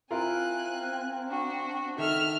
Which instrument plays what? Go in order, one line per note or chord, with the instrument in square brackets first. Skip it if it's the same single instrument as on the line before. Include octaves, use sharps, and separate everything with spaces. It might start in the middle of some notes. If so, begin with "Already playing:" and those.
[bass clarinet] C4 [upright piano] E4 F4 A#4 [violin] G#5 F#6
[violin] D4 F#4
[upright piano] D#3 A4 [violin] E5 F6